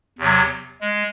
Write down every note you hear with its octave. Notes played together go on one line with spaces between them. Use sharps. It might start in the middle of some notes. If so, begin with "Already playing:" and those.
E2 C3 F#3
G#3